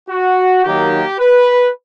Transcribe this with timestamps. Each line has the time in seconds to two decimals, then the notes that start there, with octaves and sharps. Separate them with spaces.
0.10 F#4
0.64 D#3 F#3 A#3 D#4 G4
1.19 B4